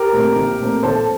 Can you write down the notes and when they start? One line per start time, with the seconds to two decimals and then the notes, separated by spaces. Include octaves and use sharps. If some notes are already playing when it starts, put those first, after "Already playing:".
Already playing: G4 A#4
0.13 A#2 A3 C4
0.36 A#1
0.60 A#2 A3 C4
0.83 A#1 A4 C5